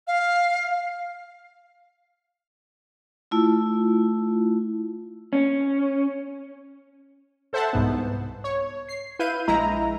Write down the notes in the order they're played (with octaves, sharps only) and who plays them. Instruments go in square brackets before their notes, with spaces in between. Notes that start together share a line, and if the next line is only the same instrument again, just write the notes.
[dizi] F5
[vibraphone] A3 E4 F4
[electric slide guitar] C#4
[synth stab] A4 C5 E5 F#5 A5
C2 G#2 B3
C#5
C7
E4 B4 F5 G6 D#7
A#1 G#3 E4 A#5